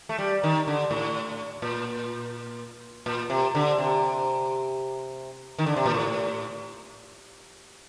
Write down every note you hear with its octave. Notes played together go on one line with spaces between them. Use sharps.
A3
G3
D#3
D3
A2
A#2
A#2
C3
D3
C3
D#3
D3
C3
A#2
A2